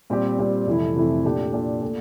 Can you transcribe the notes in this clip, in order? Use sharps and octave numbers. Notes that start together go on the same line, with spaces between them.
A#2 G3 C4 G4
A#2 G3 C4 G4
F2 C3 E3 A3 E4
F2 C3 E3 A3 E4
A#2 A3 D4 G4
A#2 A3 D4 G4
A#2 A3